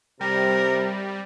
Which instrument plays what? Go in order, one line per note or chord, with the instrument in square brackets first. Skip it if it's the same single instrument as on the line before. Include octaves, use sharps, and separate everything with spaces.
[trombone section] C3 [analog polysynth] G3 [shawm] A#4